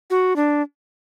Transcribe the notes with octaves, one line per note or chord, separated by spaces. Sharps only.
F#4
D4